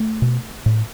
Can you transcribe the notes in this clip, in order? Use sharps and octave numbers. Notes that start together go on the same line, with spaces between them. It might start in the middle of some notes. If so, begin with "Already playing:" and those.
Already playing: A3
B2
A2